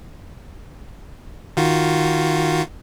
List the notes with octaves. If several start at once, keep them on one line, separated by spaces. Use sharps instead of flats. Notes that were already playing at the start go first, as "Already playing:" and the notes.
D#3 F4 F#4